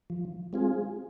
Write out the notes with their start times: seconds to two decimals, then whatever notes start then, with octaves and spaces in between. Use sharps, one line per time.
0.10 F3
0.53 G#3 C4 F4 G#4